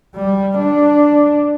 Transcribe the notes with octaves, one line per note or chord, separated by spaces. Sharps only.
G3
D4